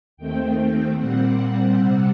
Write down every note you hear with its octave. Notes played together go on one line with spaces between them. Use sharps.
D#2 D#3 A3 C4 G5
A#2 G3 C4 F#5
C3 G3 C4